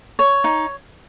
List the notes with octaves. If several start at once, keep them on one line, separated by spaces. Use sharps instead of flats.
C#5
D#4